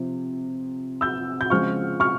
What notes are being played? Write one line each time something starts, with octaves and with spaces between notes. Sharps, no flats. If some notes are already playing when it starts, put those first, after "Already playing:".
Already playing: C3 F3 C4
E6 G6
G6
C#3 F3 G#3 C4 F4 C#6 F6
C#6 F6